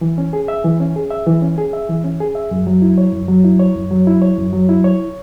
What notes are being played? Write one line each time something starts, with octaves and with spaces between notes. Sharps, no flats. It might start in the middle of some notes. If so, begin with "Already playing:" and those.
E3
C#4
G#4
E5
E3
C#4
G#4
E5
E3
C#4
G#4
E5
E3
C#4
G#4
E5
F#2
F#3
E4
C#5
F#2
F#3
E4
C#5
F#2
F#3
E4
C#5
F#2
F#3
E4
C#5